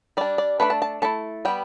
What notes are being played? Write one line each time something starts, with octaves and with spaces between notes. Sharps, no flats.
G3 D4 D5
D5
A3 D4 B4
A5
A5
A3 E4 A5
G3 B3 G5